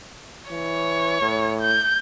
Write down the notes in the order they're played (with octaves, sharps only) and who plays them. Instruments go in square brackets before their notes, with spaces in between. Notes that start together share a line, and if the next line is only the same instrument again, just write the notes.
[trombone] E3 [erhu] C#5
[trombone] A2
[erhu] G6